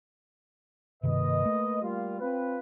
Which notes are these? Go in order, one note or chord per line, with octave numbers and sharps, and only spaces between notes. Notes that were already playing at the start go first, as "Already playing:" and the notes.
G2 C3 D#3 A#3 B4 D#5
A3
G3 A#3 F4
C4 F4 B4